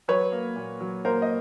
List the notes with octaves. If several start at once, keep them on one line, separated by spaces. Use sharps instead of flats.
F#3 B4 C#5
A#3
A#2
F#3
A#3 A#4 C5
D#5